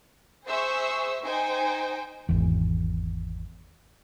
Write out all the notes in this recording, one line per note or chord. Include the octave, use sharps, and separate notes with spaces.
G#4 C5 E5 C#6 E6
D#4 C5 G5 G#5
G#1 E2